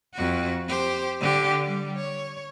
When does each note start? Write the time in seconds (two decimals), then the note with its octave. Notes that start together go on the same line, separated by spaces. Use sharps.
0.14 F2 F#4
0.69 G4 C5
1.21 D3 G4
1.65 G3
1.97 C#5